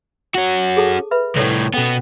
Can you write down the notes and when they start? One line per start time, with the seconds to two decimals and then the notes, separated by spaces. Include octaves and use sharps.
0.35 C#4 F#4
0.77 G#4 A4 A5
1.11 B4 E5 B5
1.36 C2 A2 A4 C#5 D5
1.74 B2 B3 C#4 A4 G5